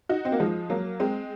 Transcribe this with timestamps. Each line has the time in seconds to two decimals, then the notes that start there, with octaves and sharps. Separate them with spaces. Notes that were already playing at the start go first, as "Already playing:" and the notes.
0.09 D#4 F#4
0.25 C4
0.32 A#3
0.40 F3 G#3
0.70 F#3 A#3
1.00 G#3 C4